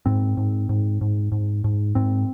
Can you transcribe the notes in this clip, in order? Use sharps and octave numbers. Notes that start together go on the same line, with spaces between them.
G#2 C4
G#2
G#2
G#2
G#2
G#2
G#2 C4